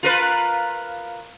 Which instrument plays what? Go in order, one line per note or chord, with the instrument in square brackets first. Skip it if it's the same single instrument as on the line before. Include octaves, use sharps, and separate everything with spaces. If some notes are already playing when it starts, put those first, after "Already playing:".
[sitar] F4 A#4 B4